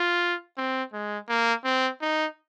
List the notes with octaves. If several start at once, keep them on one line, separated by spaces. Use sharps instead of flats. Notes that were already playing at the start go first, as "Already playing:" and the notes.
Already playing: F4
C4
G#3
A#3
C4
D#4